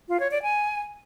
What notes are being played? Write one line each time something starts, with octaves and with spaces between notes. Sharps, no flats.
F4
C#5
D5
G#5